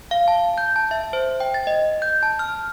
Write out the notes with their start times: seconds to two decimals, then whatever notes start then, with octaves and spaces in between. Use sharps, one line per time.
0.11 F5
0.28 A5
0.58 G6
0.76 A5
0.91 E5
1.13 C5
1.40 G5
1.54 A6
1.67 D#5
2.02 G6
2.23 A5
2.39 F6